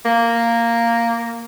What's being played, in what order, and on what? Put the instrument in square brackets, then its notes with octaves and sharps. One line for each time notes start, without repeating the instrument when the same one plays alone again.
[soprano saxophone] A#3